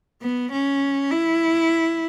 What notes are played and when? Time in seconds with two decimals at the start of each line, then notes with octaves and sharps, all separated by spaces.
0.22 B3
0.52 C#4
1.11 E4